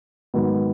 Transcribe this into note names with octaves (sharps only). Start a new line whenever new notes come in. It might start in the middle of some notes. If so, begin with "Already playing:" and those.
G#2 D#3 F#3 B3